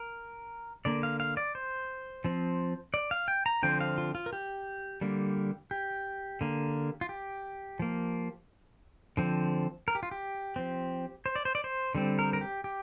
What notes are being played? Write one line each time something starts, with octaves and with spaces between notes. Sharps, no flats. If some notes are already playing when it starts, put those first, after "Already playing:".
Already playing: A#4
D3 A#3 D5
F5
F5
D5
C5
F3 C4
D5
F5
G5
A#5
D3 F3 C4 G5
F5
F4
F4
A#4
G4
D3 G3 A#3
G4
D3 A#3
F4
G4
F3 A#3
D3 F3 C4
A#4
G4
F4
G4
F3 C4
C5
D5
C5
D5
C5
D3 G3 C4
A#4
A#4
G4
G4